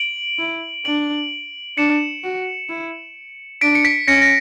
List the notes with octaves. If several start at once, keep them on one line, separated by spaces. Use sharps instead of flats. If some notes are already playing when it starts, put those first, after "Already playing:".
Already playing: D7 F#7
E4
D4 D7 F#7
D4 C#7 E7
F#4
E4
D4 B6 D7
C#7
B6 D7
C#4 A#6 C#7
A#6